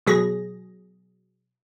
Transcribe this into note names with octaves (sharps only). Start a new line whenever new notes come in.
B2 F#3 G#4 A#6